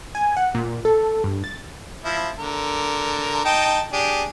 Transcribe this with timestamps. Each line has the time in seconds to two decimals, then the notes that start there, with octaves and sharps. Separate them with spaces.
0.15 G#5
0.37 F#5
0.55 A#2
0.85 A4
1.24 G2
1.44 A6
2.04 F3 E4
2.39 D3 A#4
3.45 D#4 G5 A5
3.93 D4 G4 G#4